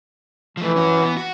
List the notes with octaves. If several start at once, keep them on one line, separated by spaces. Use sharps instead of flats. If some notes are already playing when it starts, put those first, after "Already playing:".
E3 F3 A3
C#4 F#4
B3
F#4